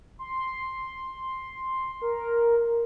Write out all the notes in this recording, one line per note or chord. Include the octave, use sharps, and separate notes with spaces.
C6
A#4